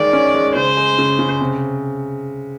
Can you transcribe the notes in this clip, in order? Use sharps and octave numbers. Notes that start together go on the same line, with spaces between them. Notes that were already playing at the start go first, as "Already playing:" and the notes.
Already playing: D#3 G#3 D5
C#4
G#3
C#3 C5
G#3
C#3
C#3
C3